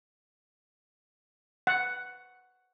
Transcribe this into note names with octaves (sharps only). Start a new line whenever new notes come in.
F#5